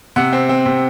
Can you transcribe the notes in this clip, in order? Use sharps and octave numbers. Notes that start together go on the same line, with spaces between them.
C3 F#5
C4
C4
C3